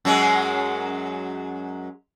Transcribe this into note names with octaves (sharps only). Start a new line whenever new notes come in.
F#2 F#3 G#3